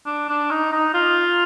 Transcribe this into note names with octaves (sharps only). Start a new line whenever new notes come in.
D4
D4
D#4
D#4
F4